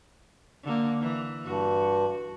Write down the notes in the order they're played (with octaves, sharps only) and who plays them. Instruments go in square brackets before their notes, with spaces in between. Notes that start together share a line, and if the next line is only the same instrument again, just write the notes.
[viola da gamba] D3 A#3
E3
[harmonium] G2 [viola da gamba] F#4